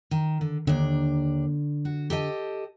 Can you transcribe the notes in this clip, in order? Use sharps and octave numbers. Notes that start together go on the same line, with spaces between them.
D#3
D3
D#2 D3 D4
F#4
G4 A4 D#5